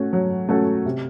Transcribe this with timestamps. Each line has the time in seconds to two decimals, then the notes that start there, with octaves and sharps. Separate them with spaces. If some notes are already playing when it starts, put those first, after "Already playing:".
Already playing: A3 C#4 F#4
0.13 F#3
0.49 A3 C#4 F#4 A4
0.86 C3